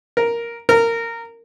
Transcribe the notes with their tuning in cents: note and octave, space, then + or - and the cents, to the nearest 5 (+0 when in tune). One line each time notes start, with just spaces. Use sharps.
A#4 +5
A#4 -15